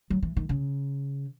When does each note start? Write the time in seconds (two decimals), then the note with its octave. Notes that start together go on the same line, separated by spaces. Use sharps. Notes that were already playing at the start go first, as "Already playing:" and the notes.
0.10 F#3
0.22 E3
0.37 D#3
0.49 C#3